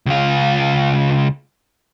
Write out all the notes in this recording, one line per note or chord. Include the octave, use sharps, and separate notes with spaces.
C#2 F4